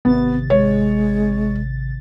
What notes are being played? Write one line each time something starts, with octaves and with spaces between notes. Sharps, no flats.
G#1 C3 B3 A6
G#3 C#5